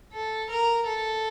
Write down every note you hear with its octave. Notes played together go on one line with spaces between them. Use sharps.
A4
A#4
A4